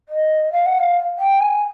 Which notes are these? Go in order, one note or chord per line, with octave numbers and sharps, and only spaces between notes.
D#5
F5
F#5
F5
G5
G#5